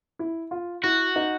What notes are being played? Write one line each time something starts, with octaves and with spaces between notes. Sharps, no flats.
E4
F4
E4 F#4
D#4